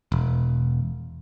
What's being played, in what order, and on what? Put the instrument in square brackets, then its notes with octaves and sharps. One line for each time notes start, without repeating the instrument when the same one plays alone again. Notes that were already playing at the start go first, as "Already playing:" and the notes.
[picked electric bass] E1